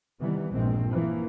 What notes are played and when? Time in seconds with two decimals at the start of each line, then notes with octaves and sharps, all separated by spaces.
0.20 C3 D#3 E3 G3 B3
0.52 A#1 G2 G#3 C4
0.90 E3 F3 A#3